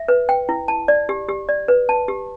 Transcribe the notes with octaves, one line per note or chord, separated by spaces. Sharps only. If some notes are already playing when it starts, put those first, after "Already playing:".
Already playing: E5
B4
G5
E4
A5
D5
G4
G4
D5
B4
A5
G4